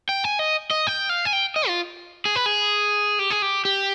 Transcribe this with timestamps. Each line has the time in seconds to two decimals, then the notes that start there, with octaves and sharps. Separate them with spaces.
0.09 G5
0.24 G#5
0.39 D#5
0.71 D#5
0.87 G5
1.09 F5
1.25 G#5
1.33 G5
1.56 D#5
1.68 F4
2.25 G#4
2.36 B4
2.46 G#4
3.19 G4
3.30 G#4
3.42 G4
3.65 G4